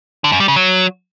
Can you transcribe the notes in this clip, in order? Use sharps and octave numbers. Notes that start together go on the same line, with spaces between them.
D3
F#2
G3
C#3
F#3